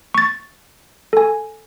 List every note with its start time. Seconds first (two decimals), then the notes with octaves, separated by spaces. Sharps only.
0.14 C#6 A6
1.13 A4 G#5